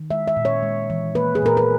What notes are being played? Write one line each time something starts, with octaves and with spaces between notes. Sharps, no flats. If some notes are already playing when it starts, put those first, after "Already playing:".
Already playing: D#3
G#3 E5
E5
A#2
C#5
G#3
E3
A#3 B4
G#4
A#2 A#4
B4